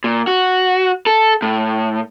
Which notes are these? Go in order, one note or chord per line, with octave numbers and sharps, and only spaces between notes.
A#2
F#4
A4
A2